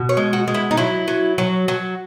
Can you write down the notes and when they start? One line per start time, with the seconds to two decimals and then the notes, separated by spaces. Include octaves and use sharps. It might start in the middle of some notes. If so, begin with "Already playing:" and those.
Already playing: B2
0.09 C#5
0.17 G#3
0.33 F#4
0.48 G#3
0.54 E4
0.71 D#4
0.77 F#3 E4
1.08 F#3
1.38 F#3
1.68 F#3